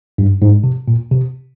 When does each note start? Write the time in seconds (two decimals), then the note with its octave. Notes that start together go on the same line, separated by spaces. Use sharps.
0.18 G2
0.42 G#2
0.64 C3
0.88 A#2
1.11 C3